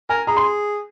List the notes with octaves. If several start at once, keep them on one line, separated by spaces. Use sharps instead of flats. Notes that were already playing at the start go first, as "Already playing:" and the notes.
A#4 G#5
G#4 A#5
C6